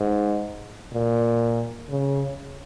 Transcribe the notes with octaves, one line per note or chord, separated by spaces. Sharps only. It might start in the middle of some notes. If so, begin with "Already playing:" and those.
Already playing: G#2
A#2
C#3